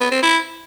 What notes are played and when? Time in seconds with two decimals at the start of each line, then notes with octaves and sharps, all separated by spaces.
0.01 B3
0.12 C4
0.22 E4